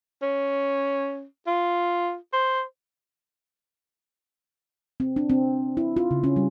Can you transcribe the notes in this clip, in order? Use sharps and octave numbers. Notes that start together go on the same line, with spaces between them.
C#4
F4
C5
C4
D4
C4
E4
F4
C#3
C#4
G3